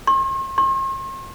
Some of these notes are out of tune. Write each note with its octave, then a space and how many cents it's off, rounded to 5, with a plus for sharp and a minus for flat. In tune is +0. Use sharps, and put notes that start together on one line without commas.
C6 +45
C6 +45